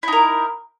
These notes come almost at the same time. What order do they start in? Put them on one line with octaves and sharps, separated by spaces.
E4 D#4 A#4